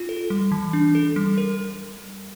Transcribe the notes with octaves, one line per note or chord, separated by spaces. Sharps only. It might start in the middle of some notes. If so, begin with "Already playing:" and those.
Already playing: F4
A4
G3
E3
D4
A4
G3
A#4